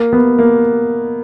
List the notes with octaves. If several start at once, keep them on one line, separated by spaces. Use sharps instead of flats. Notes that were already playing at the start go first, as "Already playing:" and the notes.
Already playing: A#3
B3
A#3